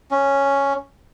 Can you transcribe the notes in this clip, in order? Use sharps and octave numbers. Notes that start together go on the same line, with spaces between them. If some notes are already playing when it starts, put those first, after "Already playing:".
C#4